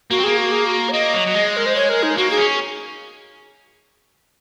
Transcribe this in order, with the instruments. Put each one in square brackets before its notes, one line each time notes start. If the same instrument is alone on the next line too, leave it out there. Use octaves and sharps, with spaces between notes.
[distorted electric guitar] A#3 [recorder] F#4
[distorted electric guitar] C4
[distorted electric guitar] A#3 [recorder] G#4
[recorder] F#4
G#4
F#4
C#5
[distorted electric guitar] A#3 [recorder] D#5
[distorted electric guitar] F#3
F#3
G#3
[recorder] A#4
C5
C#5
A#4
D#4
[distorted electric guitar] A#3 [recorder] F#4
[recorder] G#4
[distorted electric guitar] C#4